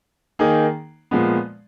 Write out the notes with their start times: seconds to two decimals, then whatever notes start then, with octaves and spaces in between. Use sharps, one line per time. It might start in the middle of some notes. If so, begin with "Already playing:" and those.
0.39 D#3 A#3 D#4 G#4
1.11 A#2 F3 G#3 B3